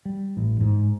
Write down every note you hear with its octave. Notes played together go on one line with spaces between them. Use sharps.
G3
A1
G#2